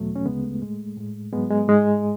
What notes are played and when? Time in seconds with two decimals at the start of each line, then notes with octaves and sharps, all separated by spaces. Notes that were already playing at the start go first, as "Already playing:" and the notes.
Already playing: E2 B2 F#3 A3
0.16 C#4
0.26 D2 C#3 G#3 B3
0.43 A3
0.61 A2 G#3
0.97 A2 G#3
1.33 G#2 F#3 G#3 B3
1.50 G#3
1.68 G#2 G#3